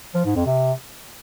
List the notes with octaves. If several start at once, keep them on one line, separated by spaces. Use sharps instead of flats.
F3
G#2
F2
C3